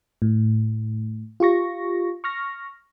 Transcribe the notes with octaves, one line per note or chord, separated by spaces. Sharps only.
A2
F4 G4 C#6 A#6
C#6 F6 A#6